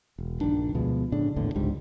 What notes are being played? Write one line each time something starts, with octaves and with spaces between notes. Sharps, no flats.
E1
A#1 G2 D#3 D4
D2 B2 F3 G#3
A2 C#3 D4
A#1 E2 A2 D3
C#2 G#2 D3 G3